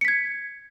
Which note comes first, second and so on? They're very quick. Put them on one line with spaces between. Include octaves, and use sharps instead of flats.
C#7 B6 G#6